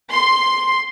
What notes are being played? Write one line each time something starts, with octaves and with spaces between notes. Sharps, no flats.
C6